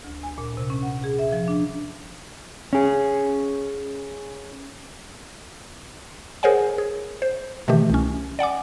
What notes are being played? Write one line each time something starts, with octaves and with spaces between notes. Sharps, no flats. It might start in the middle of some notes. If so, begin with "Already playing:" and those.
D2
G#5
A#2
C3
C#4
F#5
G#4
E5
F3
D4
C#4 G#4
G#4 A#4 C5 C#5 F#5 G#5
G#4
C5
B2 D#3 E3 A3 G4
C2 C#4
D5 F#5 G#5 D6